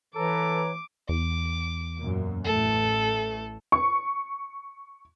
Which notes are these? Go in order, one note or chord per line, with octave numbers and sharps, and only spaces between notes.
E3 A4 B4 C#5 A#5 D6
E2 D6
F#2 A#2
A1 A3 A4
C#6